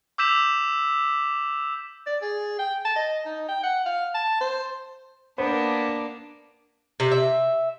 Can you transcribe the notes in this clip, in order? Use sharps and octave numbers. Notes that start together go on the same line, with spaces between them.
D6 E6 G6 B6 E7 F7
D5
G#4
G5
A5
D#5
D#4
G5
F#5
F5
A5
C5
A#3 B3 D4 C5
C3
E5